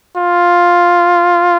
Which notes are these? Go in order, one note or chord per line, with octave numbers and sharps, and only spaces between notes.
F4